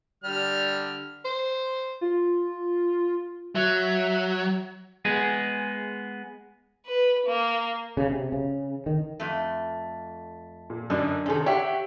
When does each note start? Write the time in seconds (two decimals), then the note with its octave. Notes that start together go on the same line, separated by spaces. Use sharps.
0.24 D3 G3 F6
1.25 C5
2.01 F4
3.55 F#3 E5
5.05 G#3 B3 G#4
6.87 B4
7.27 A#3
7.97 C#3
8.11 C3
8.32 C#3
8.86 D#3
9.20 F2 A3
10.70 A#2
10.90 F#2 D3 D4 D#4
11.26 C3 D#3 C#4 G#4 A4
11.46 G4 C#5 E5 F#5